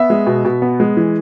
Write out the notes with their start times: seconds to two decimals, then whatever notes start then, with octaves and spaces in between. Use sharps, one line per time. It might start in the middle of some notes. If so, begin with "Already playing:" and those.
Already playing: B3 E5
0.10 G#3
0.27 B2
0.45 B2
0.62 B3
0.80 G#3
0.97 E3